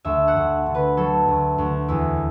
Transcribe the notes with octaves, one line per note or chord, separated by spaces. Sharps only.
D2 E5
F#5
D2
D3
B4
F#3 A4
D2
D2
E2 E4